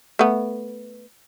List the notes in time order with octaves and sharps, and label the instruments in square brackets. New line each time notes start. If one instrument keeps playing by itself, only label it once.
[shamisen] A3 B3